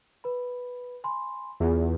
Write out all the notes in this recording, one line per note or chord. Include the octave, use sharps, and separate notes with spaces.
B4 B5
G#5 B5 C6
E2 F4 G#4